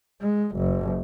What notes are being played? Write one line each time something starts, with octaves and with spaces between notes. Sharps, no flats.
G#3
F#1